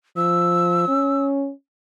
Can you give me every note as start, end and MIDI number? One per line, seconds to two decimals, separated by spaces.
0.17 0.88 53
0.17 1.26 88
0.88 1.51 61